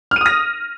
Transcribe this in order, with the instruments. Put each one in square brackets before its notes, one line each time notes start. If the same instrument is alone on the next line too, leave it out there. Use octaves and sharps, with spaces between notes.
[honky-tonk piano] F6
D#7
D#6
A#6